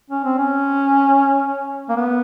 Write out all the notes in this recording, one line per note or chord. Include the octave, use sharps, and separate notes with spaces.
C#4
C4
C#4
A#3
B3